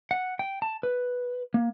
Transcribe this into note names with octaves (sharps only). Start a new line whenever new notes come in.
F#5
G5
A5
B4
A#3